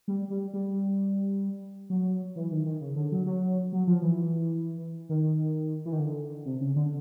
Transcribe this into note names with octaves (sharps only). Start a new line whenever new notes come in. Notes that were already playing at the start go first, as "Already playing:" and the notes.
G3
G3
G3
F#3
E3
D#3
D#3
C#3
D3
F#3
F#3
F#3
F3
E3
D#3
E3
D#3
D3
C3
C#3
D3